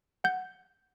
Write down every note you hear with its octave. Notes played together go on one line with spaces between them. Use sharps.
F#5 G6